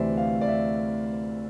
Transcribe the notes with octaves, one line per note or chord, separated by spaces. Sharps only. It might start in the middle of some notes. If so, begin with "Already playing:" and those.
Already playing: D2 C3 E3 C5 D5 E5
F5
D5
E5